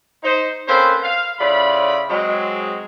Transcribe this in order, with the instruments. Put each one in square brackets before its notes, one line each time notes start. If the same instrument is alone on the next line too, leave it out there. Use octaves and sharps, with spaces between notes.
[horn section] D#4 C5
A#3 C4 C#4 A4 B4 C5
F5
A2 C#3 F4 D5 B5
F#3 G#3 C4